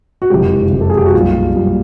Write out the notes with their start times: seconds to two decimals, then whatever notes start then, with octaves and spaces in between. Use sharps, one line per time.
0.22 F#4
0.30 F#1 F2 C3 F3 G#3 G4
0.72 F#1 F2 C3 F3 G#3
0.81 A4
0.90 G#4
0.97 G4
1.06 F#4
1.14 B1 A#2 G3 F4
1.55 B1 A#2 G3